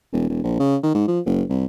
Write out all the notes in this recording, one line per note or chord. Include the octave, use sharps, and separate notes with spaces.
E1
E1
A#1
C#3
D#3
G#2
F3
F#1
C2